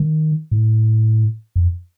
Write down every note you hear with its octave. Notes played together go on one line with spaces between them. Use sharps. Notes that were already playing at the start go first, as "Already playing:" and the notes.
Already playing: D#3
A2
F2